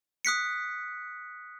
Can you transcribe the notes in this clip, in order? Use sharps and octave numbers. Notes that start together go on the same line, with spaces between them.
D#6 F#6 B6 C#7